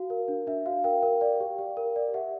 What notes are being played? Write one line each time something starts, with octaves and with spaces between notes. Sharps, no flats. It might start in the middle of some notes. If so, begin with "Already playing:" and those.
Already playing: F#4 F5
A#4
D4
D4 E5
F#4 F5
A#4 F5 G5
A#4
D5
G4
G4
A#4
D5
G4 E5 F#5